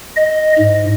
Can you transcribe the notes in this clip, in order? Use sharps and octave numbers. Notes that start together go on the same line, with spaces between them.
D#5
G#2